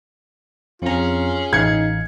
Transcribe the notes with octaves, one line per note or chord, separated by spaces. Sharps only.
F2 C#4 F4 G#4 A#5
A1 D#4 F5 G#6 C#7